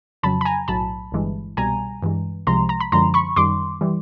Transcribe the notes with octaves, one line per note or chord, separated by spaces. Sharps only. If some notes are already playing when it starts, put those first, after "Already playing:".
F2 C#3 F#3 A5 B5
B5
G#5 A#5
B1 A2 F#3 A5 B5
G1 G2 E3 G#3
C2 B2 G3 G#5 A#5
G2 E3 G#3
C2 C3 F3 G#3 A#5 C6
A#5
B5
F#2 D3 F3 G#3 A#5 C6
B5 C#6
F#2 D#3 G3 C6 D6
E3 G3